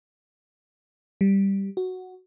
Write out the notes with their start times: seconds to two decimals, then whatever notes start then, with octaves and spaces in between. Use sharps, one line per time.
1.21 G3
1.77 F#4